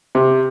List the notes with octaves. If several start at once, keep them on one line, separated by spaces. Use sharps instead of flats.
C3